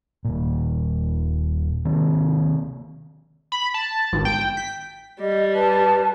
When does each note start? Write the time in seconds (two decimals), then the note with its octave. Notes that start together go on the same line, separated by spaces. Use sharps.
0.25 D#1 A#2
1.85 C3 D#3 A#3 C4
3.52 B5
3.74 A5
4.13 G#1
4.25 G5
4.57 B6
5.21 G3 D#5
5.55 B4 A5